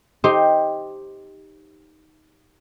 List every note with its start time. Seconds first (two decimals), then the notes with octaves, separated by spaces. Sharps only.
0.24 D#4 G4 C5